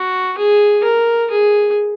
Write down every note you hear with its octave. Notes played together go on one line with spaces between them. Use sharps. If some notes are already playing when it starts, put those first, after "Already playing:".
Already playing: F#4
G#4
A#4
G#4